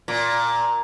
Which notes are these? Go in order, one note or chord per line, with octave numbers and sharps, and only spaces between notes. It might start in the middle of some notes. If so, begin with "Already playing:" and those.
A#2